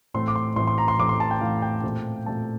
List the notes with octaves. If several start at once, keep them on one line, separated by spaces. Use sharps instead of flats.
A2 E3 A3 C4 C6
D6
C6
A2 E3 A3 C4 C6
C6
A#5
C6
A2 E3 A3 C4 D6
C6
A5
G5
A2 E3 A3 C4 F5
G5
A#2 A3 C4
A#2 A3 C4 A5